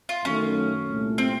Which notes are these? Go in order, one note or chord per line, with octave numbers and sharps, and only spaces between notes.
F4
F#2 D#3 F#3 A3 C#4
C2 A#2 A3
C4